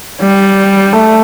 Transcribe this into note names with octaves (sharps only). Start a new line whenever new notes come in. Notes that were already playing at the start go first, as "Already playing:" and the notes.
G3
A3